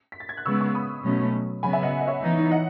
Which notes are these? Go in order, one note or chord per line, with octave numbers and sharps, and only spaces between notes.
B6
A6
G#6
F#6
C#3 G#3 B3 C#6 E6
C#6 E6
B5 D#6
B2 F#3 A3 C#4
C#3 F#3 B3 G#5 B5
E5 G#5
D#5 F#5
D#5
C#5 E5
E3 B3 D#4
D#5 F#5